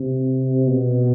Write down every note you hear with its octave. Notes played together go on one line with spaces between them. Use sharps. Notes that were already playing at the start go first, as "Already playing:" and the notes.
Already playing: C3
B2